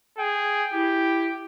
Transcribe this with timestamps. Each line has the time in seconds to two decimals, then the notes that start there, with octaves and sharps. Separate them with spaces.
0.18 G#4 G5
0.73 E4 G4